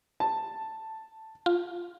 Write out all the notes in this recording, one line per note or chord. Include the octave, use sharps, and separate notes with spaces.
A5
F4